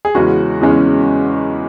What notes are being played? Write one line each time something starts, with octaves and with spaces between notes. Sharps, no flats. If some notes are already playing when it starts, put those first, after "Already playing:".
G#4
E2 C#3 G#3 C#4 F#4
E2 C#3 G#3 C#4